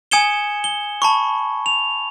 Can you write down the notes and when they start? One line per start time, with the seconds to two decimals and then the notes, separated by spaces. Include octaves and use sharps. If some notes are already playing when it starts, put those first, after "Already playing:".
0.11 G#5 D#6 G#6 C#7 E7 G7
0.64 G7
1.02 A5 B5 C#6
1.66 F7